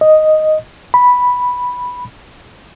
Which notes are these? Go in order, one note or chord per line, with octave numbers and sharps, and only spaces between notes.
D#5
B5